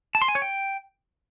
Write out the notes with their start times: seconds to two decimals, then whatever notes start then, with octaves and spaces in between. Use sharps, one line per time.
0.15 A5
0.22 C6
0.28 G#5
0.35 C#5
0.42 G5